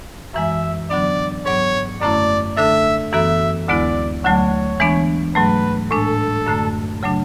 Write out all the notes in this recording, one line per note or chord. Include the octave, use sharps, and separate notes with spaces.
F#2 E3 G#3 E5
D3 F#3 B3 D4 D5
G#2 F#3 B3 C#5
F#2 D3 A3 C#4 E4 D5
D3 A3 D4 A4 E5
F#2 E3 B3 F#4 A4 E5
D2 D3 G#3 B3 E4 D5
D2 D3 F#3 A3 C#5
E3 G#3 B3 D4
G#2 F#3 A3 B4
A2 G#3 D4 A4
F#2 D3 A3
C#3 F#3 A3 D4